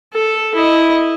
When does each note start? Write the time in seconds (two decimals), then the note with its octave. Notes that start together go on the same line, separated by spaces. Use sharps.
0.14 A4
0.55 E4 D#5